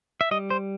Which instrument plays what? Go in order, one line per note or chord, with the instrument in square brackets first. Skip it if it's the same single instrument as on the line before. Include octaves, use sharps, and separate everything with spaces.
[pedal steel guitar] E5
G3 D#5
C5